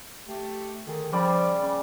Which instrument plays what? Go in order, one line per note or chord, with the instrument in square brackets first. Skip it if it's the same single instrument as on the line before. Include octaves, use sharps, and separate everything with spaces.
[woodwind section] A3 G4
[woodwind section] D3 D#3 [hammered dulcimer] G#4
[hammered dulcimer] C#3 G3 D5 [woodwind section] F3
[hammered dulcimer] C#3